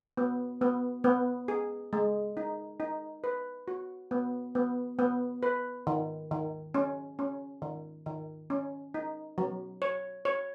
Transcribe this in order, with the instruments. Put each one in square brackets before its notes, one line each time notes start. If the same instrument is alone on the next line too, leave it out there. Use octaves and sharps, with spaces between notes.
[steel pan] B3
B3
B3
G#4
G#3
D#4
D#4
B4
F#4
B3
B3
B3
B4
D#3
D#3
C#4
C#4
D#3
D#3
C#4
D#4
F#3
C#5
C#5